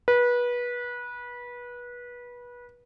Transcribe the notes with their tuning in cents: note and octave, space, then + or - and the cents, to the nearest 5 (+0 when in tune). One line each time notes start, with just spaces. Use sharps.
B4 -25